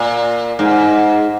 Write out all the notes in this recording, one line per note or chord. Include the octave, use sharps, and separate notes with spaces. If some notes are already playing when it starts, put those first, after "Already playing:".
Already playing: A#2
G#2